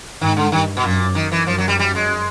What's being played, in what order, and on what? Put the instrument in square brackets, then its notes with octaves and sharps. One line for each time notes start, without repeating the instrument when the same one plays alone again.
[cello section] G#2 [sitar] D#3
[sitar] D3
[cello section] G2 [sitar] D#3
[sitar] B2
[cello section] F#2 [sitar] A#2
[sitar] D#3
E3
[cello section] F#2 [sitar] F3
[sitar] F#3
G3
G3
G#3